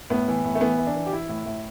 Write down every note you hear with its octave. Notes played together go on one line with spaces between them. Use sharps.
A2 B3
E3
A2
A3
E3 B3
E3
D4
E3
G4
E3 E4
A2
A2